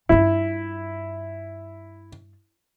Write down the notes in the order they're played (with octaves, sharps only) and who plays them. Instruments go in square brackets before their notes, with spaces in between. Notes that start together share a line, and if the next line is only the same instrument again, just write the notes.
[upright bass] G2 F4 [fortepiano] E4